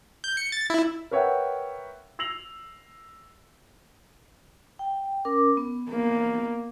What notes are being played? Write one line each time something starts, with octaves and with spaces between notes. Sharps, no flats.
G6
C#7
A6
E4
A#4 B4 C#5 E5 F#5 G5
E6 A#6 C7 F7 F#7
G5
C#4 A#4 D6
B3
A#3